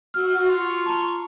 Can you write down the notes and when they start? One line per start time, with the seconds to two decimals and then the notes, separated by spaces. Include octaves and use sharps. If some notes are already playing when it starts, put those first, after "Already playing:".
0.14 F#4 E6 F6
0.49 F4 C#6
0.86 A5 A#5